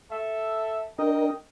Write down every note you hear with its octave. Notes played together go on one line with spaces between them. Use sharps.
A4 E5
D4 A#4 D#5 G5